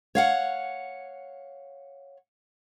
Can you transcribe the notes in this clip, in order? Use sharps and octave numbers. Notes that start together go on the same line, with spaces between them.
C#5 F5 F#5